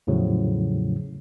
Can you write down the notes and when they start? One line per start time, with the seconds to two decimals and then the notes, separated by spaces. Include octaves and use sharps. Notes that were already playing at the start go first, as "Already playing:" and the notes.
0.07 E2 A2 C#3 F3 F#3